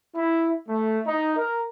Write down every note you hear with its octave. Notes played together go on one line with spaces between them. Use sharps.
E4
A3
D#4
A#4